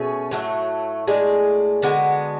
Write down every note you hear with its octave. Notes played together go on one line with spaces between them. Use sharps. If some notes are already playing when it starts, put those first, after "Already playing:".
Already playing: B2 A3 C#4 G#4
A2 F#3 A3
A2 G#3 D4 G#4
D3 G#3 B3 F#4